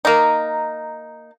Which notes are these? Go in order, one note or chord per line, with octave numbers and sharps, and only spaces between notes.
A#3 D#4